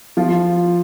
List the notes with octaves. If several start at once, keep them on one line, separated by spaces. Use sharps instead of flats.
F3 F4